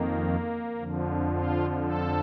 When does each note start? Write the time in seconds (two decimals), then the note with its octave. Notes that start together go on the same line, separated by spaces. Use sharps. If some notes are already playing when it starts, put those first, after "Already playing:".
Already playing: F2 D#3 A#3
0.77 F2 D3 F3
1.30 F4
1.82 A4